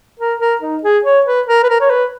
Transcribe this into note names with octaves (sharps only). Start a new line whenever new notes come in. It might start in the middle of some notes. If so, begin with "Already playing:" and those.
A#4
A#4
D#4
G#4
C#5
B4
A#4
B4
A#4
C#5
B4